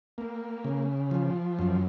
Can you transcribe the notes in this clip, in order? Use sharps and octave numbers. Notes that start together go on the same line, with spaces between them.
A#3
C#3
F3
F#2